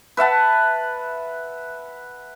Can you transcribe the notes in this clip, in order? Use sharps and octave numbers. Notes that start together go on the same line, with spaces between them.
B4 E5 F#5 A5